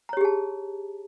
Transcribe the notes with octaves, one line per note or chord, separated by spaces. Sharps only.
G4 G#4 C#5 A5 A#5